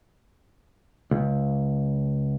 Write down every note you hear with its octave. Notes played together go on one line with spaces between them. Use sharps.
C#2